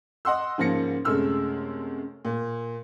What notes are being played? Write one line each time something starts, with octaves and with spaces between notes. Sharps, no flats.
D#5 F#5 C6 E6
G#2 C#3 F3 A#3 A#6 C#7
F#2 C3 G#3 A3 E6 F6
A#2